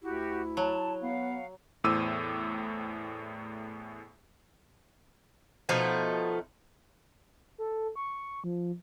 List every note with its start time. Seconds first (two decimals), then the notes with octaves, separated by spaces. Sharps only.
0.02 D2 E4 F#4 G4
0.57 F#3 A5
1.03 B3 F5 F#5
1.84 E2 A2 C5 D6 E6 D#7
5.69 B2 F3 A3 D#4
7.58 A4
7.96 C#6
8.44 F3